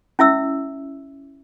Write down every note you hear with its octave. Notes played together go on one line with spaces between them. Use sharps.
C#4 E4 E5 E6